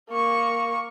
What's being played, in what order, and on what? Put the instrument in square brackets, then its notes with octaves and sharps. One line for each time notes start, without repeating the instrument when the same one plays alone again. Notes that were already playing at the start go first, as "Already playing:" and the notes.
[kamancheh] A#3 C#6